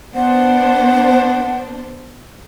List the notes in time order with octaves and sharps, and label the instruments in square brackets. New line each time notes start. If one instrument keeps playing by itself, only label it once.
[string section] B3 D4 C5 [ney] F#5